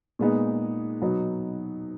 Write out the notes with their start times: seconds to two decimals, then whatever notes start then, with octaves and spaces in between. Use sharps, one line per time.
0.19 A#2 G#3 B3 D#4
1.02 B2 F#3 B3 D#4